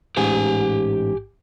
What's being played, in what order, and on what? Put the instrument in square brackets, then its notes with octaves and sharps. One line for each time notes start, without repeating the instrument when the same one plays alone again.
[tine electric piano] A1 G#2 [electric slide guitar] G4 G#5